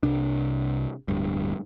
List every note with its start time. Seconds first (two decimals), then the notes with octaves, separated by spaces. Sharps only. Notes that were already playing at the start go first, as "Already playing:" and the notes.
0.03 C2 C3 D4
1.08 D1 G2